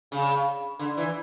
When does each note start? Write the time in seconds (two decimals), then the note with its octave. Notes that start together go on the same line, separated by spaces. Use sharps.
0.12 C#3
0.79 D3
0.97 E3